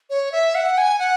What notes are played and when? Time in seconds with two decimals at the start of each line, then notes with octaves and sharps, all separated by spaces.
0.10 C#5
0.32 E5
0.55 F#5
0.78 G#5
0.99 F#5